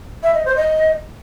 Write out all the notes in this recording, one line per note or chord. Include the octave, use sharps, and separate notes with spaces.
E5
D#5
C5
D#5